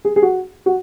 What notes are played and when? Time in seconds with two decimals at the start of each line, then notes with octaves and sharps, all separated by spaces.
0.05 G#4
0.16 G#4
0.22 F#4
0.66 F#4